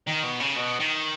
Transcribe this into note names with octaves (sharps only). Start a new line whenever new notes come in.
D#3
B2
C#3
B2
D#3